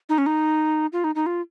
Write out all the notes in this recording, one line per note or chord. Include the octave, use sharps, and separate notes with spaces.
D#4
C#4
D#4
F4
D#4
D#4
F4